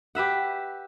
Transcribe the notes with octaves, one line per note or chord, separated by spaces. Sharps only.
G4 B4 E5 F#5